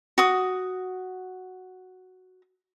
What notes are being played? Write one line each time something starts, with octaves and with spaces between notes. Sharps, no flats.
F#4 D#6